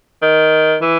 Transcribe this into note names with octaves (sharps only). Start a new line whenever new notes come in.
D#3
E3